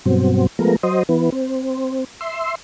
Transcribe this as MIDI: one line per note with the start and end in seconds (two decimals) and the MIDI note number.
0.05 0.47 43
0.05 0.47 47
0.05 0.47 54
0.05 0.47 60
0.59 0.76 53
0.59 0.76 56
0.59 0.76 57
0.59 0.76 59
0.59 0.76 70
0.83 1.03 54
0.83 1.03 72
0.83 1.03 75
1.09 1.30 52
1.09 1.30 59
1.32 2.04 60
2.21 2.55 76
2.21 2.55 84